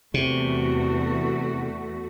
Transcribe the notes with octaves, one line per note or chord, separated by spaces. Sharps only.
E2 C3 A3 F#4